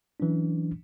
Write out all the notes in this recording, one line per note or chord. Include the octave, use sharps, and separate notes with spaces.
E3 F#3 C#4 D4